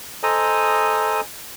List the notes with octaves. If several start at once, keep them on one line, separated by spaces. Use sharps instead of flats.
A4 C5 D#5 G#5 A#5 D#6